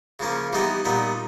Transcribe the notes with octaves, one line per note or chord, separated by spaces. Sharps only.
C#3 F3 A#3 C#4
E3 G3 B3 D#4 G4
A#2 G3 B3 D#4